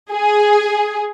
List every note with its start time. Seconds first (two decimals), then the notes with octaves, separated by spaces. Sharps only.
0.12 G#4